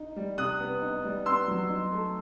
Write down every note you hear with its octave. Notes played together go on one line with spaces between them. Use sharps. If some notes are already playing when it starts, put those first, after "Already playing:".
Already playing: D#4
G3
C3 D#6 F#6
B3
D#4
G3
B3 C6 E6
F#3
D#4
A3